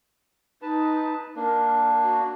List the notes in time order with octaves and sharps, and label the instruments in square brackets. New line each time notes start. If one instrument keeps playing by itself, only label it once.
[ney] D#4 [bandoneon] B4 A5
[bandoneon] A#3 D4 [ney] A#4
[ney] F#4